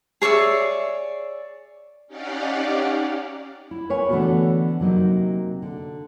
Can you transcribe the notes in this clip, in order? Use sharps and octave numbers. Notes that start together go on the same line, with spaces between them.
G#4 C#5 D5 E5
C#4 D#4 G4 D5 F5 F#5
E4
A#4 B4 C#5 G#5
D3 E3 A3 B3 C4 F#4
C3 F#3 A#3 D#4
D3